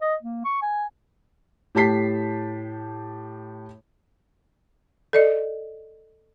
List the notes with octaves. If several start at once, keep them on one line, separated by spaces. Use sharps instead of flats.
D#5
A#3
C#6
G#5
A2 G4 A5 B6 C7
A4 D5 D#5